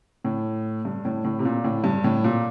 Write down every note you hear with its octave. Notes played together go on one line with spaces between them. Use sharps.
A2
G2
A2
A2
C3
A#2
A2
G2
A2
A#2